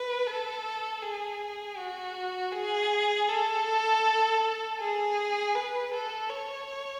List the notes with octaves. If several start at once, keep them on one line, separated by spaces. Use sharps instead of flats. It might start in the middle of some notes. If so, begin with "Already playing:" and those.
Already playing: B4
A4
G#4
F#4
G#4
A4
G#4
B4
A4
C#5